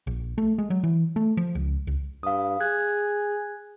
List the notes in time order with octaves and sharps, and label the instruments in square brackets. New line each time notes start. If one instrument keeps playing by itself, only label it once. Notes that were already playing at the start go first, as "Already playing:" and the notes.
[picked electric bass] A#1
A3
G#3
F#3
E3
A3
F3
C#2
C#2
[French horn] G2 [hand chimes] F5 D#6
[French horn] G#4 [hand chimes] F#6 G#6